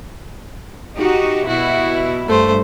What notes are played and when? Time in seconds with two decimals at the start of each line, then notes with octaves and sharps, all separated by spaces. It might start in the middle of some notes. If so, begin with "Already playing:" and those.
0.96 D#4 F#4 G4
1.48 B2 E4 F#4
2.28 G2 A3 C5